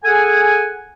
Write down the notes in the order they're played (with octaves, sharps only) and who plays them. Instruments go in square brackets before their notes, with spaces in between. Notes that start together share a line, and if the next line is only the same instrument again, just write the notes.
[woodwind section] G#4 A4 F#5 G#5